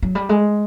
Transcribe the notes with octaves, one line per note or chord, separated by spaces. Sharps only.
F#3
G3
G#3